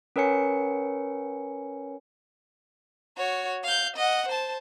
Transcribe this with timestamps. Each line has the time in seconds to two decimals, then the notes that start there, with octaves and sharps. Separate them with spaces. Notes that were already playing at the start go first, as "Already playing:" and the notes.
0.16 C#4 A#4 B4 C#5 G#5 C#7
3.17 F#4 C#5
3.64 F5 G6
3.96 D#5 F#5
4.28 C5 A5